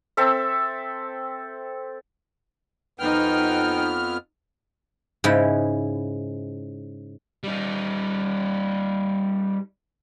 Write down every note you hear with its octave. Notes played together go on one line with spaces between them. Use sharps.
C4 A4 E5
F2 B3 D#4 G5 F6
G#2 C#3 E4
G3 D#4